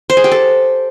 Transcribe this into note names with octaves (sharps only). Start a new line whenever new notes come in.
C5
G#4
G4
A4